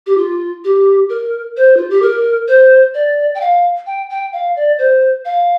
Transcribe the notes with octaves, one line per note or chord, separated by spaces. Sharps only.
G4
F4
G4
A#4
C5
F4
G4
A#4
C5
D5
G5
F5
G5
G5
F5
D5
C5
F5